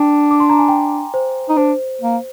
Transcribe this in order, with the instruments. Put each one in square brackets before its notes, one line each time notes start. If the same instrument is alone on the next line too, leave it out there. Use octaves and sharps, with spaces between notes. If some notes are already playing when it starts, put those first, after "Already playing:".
Already playing: [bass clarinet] D4 [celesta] G5
[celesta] D6
C6
A#5
G#5
G5
C5
[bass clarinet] D#4
[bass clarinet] D4 [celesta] C5
[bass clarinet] A#3